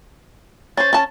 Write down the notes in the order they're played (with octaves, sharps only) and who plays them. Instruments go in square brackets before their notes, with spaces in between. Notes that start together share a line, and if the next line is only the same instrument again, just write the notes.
[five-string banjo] C#4 C5 [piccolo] A6
[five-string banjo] C#4 A5